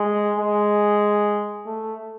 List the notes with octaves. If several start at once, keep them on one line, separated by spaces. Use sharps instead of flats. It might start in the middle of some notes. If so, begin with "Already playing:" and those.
Already playing: G#3
G#3
A3